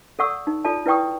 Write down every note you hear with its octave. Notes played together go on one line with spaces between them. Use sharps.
A4 D5 F#5 C#6 E6
D#4
F4 A4 D5 A5
E4 B4 D5 G5 C#6 D#6